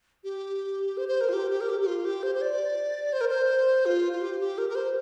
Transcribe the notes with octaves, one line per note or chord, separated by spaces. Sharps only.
G4
C5
C5
A#4
F4
G4
G4
A#4
G4
G4
F4
G4
C5
C5
D5
C5
A#4
C5
F4
F4
G4
G4
A#4
A#4
C5